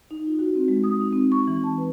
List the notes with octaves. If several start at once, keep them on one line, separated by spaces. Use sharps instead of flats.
D#4
F4
F#4
C4
G#3
D#6
D#4
C4
C#6
E3
A5
B4